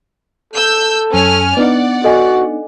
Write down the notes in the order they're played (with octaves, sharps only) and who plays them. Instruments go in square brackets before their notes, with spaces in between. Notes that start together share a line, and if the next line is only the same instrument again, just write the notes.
[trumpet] A4 [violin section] E6 G6
[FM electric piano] F#2 [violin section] C#4 G#5 F6
[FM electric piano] B3 D4 D#4 [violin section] D5 F#5
[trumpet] F#4 [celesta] A4 D#5 G#5